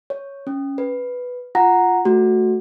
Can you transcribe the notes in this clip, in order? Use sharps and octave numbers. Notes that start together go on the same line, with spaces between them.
C#5
C#4
B4
F4 F#5 A#5 A#6
A3 F#4